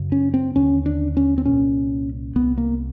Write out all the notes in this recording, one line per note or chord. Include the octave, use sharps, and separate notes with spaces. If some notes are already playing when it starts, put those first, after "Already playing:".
Already playing: F#2 C#3
C#4
C4
D#2 D3 C#4
D4
C#4
C4
C2 A#2 C#4
C2 C3 B3
A#3